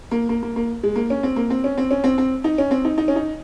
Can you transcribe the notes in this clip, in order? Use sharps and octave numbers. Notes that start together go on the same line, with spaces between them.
A#3
A#3
A#3
A#3
G#3
A#3
C#4
C4
A#3
C4
C#4
C4
C#4
C4
C4
D#4
C#4
C4
D#4
D#4
C#4
D#4